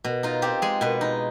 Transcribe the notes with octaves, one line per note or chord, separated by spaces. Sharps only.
B2
D#4 F4
C4 G4
G#3 G#4
B2 B4
D#4